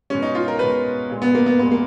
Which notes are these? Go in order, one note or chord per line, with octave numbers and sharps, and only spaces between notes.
B2 G#3 C#4
D#4
F4
A#4
B2 G#3 B4
A#2 G#3
B3
A#3
B3
A#2 G#3 B3
A#3